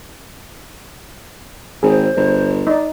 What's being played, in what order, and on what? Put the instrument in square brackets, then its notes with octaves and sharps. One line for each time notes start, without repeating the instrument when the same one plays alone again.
[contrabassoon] G#1 [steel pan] G#4 [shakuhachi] C5
[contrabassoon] G1
[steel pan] D#4 [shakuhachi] D5